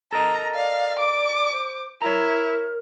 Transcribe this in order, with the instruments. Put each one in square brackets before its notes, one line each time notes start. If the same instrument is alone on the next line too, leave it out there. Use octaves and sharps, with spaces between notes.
[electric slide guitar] A4 A#4 D#5 [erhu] A#5
[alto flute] D5 [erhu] F5
[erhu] D6
[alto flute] C5
[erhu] E4 [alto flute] A#4 [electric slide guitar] C#5 A#5